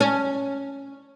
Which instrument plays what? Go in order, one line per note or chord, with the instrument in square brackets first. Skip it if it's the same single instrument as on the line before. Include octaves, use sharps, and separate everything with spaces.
[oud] C#4